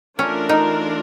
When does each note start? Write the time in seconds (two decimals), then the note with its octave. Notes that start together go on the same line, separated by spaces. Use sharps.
0.19 E3 A3 C#4 D4 F4 A#4
0.49 D#4